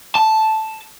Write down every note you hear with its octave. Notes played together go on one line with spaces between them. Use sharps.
A5